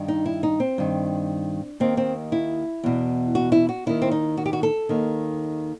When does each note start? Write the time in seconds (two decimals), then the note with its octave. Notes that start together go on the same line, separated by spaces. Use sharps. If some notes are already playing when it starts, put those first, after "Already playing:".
Already playing: G2 D#3
0.08 D#4
0.26 E4
0.43 D#4
0.60 C4
0.78 G2 D#3
1.80 D#2 D#3 C4
1.97 C4
2.32 E4
2.84 E2 B2
3.35 F#4
3.52 E4
3.69 F#4
3.86 D#2 D#3 E4
4.02 C4
4.12 D#4
4.37 F#4
4.46 G4
4.53 F#4
4.63 A4
4.89 D#2 D#3